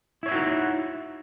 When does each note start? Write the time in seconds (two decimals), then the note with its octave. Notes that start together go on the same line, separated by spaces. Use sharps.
0.23 E4
0.26 C#5
0.29 E5
0.32 F#4
0.34 D#4